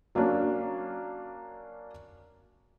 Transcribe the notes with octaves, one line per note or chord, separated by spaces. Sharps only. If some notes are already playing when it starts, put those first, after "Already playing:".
F#3 A#3 C#4 D4